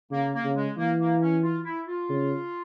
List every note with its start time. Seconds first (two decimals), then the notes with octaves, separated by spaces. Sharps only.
0.11 C#3 A#3
0.33 A#3
0.44 C#3
0.55 G#3
0.77 E3 A#3
0.99 A#3
1.21 C#4
1.43 F4
1.65 E4
1.87 F4
2.09 C#3